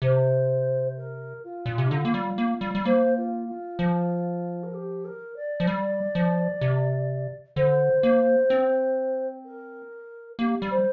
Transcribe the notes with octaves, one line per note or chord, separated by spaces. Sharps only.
C3 C5
A#4
F4
A#2
C3
D4
D3 F4
A#3
G3
A#3
G3
G3
A#3 C5
F4
F4
F3
A#4
G4
A#4
D5
F3
G3
F3
C3
D3 C5
A#3
C4
A#4
A#3 G4
G3
C5